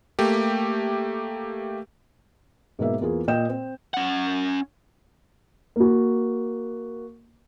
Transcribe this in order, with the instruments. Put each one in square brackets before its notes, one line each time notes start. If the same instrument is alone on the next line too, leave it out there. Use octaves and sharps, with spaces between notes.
[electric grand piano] A3 A#3 G4
[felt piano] G#2 B2 A#3 E5
E2 A#3 F4 G#4
A#2 D#5 G5 G6 E7
C4
[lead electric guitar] C#4 F#5
[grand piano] A#3 F#4